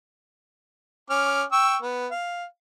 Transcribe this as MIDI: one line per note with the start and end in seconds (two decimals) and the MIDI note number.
1.10 1.43 61
1.10 1.43 86
1.10 1.43 89
1.52 1.77 79
1.52 1.77 85
1.52 1.77 88
1.82 2.07 59
2.11 2.45 77